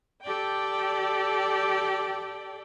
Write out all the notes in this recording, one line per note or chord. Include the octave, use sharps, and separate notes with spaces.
G4 A4 D5 G5